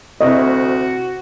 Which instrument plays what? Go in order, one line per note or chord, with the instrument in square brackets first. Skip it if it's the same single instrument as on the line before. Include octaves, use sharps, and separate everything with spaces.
[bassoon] D2 [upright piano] C3 C4 E4 [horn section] F#4 [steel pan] D#5